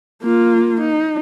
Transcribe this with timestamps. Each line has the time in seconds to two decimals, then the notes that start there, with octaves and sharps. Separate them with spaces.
0.23 A#3 F4
0.80 D#4